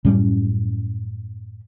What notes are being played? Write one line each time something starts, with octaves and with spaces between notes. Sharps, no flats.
F#2 A2 G3 C#4